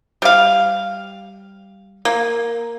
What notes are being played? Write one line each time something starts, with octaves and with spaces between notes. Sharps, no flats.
G3 F5
A#3